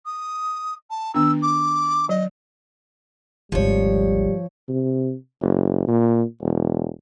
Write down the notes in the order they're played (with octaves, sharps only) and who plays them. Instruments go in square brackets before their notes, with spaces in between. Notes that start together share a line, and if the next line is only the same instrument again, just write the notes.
[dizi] D#6
A5
[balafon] D#3 B3 D4 [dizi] E6
[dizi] D6
[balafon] F#3 [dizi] D#5
[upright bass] G#1 D2 [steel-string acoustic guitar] F3 C#5 [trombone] G3
[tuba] C3
F#1
A#2
E1